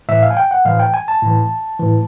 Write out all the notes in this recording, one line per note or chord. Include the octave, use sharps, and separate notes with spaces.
A2 E3 E5
F5
G#5
G5
F#5
A2 E3 F5
G5
G#5
A5
A2 E3
A2 E3